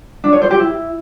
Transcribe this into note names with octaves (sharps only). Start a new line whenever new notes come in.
D4
C#5
C5
G4
E4